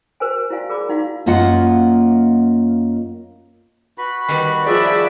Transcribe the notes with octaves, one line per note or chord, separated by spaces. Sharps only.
F#4 A#4 C5 G#5
E4 F#4 D5 F5 G#5
G#4 A#4 D5 B5 D6
D#4 E4 F#4 F5
F#2 A#3 F4 D#5 F#5
F#4 B4 B5
D#3 G3 B3
F3 G#4 D5 E5